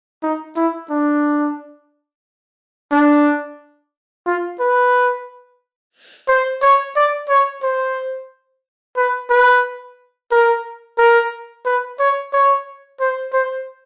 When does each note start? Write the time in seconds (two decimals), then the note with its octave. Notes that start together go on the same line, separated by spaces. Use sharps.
0.23 D#4
0.56 E4
0.90 D4
2.91 D4
4.26 F4
4.60 B4
6.28 C5
6.62 C#5
6.95 D5
7.29 C#5
7.62 C5
8.97 B4
9.30 B4
10.31 A#4
10.98 A#4
11.65 B4
11.99 C#5
12.33 C#5
13.00 C5
13.33 C5